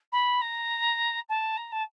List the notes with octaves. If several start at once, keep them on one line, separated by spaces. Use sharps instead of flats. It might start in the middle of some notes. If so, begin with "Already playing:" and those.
B5
A#5
A5
A#5
A5